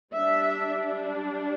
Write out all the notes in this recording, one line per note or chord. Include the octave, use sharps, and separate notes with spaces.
G3 D4 E5